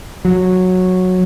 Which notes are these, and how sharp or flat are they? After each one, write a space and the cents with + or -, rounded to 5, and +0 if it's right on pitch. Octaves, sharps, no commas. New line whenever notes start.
F#3 -10